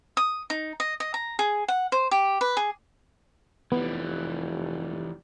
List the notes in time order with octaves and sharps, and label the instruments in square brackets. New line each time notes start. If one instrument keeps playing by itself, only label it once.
[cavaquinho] D#6
D#4
D#5
D#5
A#5
G#4
F#5
C5
G4
B4
G#4
[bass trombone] F1 [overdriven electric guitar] E3 G3 [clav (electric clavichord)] B3